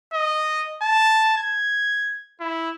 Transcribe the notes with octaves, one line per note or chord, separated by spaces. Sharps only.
D#5
A5
G#6
E4